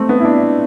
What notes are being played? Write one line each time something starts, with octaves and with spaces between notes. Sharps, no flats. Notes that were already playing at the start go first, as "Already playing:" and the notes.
Already playing: A3 C4
B3
E4
D4